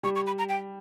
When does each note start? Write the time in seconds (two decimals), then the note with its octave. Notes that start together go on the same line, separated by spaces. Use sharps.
0.03 G3 C#6
0.16 C#6
0.27 B5
0.39 A#5
0.49 G5